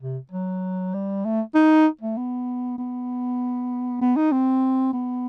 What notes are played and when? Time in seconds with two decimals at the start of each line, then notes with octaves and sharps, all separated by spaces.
0.02 C3
0.32 F#3
0.94 G3
1.25 A3
1.55 D#4
2.01 A3
2.17 B3
2.78 B3
4.01 B3
4.17 D#4
4.32 C4
4.93 B3